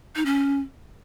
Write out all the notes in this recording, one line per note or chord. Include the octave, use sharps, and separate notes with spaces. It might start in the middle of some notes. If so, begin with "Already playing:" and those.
D#4
C#4